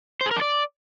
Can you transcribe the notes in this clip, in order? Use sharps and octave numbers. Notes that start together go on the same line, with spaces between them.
C5
G#4
A#4
D4
D5